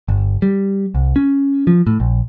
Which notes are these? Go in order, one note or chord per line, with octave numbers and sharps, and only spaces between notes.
G1
G3
C2
C#4
F3
A2
A#1